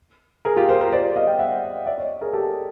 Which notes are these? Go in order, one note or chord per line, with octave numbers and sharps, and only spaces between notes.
G#4 A#4
F4 G4
A#4 C5
A#4 C5
C5 D5
D#5 F5
F5 G5
E5 F#5
D5 E5
C#5 D#5
G#4 A#4
G4 A4